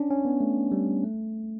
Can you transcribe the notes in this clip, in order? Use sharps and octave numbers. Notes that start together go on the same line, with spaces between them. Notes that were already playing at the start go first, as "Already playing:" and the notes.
Already playing: C#4 D4
C#4
B3
A3
G3
A3